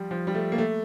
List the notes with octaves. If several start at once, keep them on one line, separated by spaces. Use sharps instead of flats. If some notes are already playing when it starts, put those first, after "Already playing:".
Already playing: F3 G3
F3
G3
A3
A#3
A3